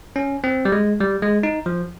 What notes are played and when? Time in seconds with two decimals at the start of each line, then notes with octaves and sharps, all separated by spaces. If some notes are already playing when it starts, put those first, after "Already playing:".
0.16 C#4
0.44 C4
0.65 G3
0.72 G#3
1.01 G3
1.22 G#3
1.43 D#4
1.66 F3